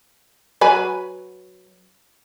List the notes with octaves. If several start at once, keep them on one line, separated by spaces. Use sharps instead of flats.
F#3 B4 G#5